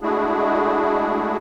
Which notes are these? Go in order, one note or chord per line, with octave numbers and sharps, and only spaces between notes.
G#3 A3 D4 E4 F#4 G#4